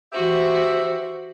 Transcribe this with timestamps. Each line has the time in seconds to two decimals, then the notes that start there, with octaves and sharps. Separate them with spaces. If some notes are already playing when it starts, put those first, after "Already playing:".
0.13 E3 F#4 G4 C5 E5